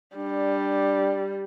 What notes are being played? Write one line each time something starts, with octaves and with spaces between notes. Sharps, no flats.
G3 D4